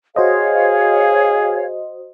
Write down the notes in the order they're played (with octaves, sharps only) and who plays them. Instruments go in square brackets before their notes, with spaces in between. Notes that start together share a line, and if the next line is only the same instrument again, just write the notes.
[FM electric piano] F#4 C5 D#5 [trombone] G#4 [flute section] C#5 F5